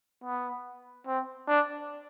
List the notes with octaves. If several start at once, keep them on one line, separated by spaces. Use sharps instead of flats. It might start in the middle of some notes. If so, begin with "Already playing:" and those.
B3
C4
D4